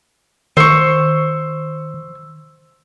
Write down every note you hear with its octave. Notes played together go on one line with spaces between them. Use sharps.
D#3 C5 C#6 E6